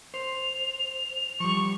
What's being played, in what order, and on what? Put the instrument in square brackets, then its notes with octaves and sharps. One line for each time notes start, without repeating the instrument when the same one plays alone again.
[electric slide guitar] C5 [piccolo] F7
[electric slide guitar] F3 G3 [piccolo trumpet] C#6